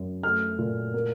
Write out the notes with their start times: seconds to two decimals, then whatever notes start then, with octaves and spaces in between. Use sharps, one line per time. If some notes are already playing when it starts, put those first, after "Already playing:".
Already playing: F#2
0.23 A3 F6
0.58 A#2
0.94 A#3